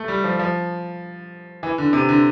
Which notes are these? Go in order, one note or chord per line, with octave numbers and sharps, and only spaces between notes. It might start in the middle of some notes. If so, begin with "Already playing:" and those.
Already playing: A3
G3
F3
F3
E3
D3
C3
D3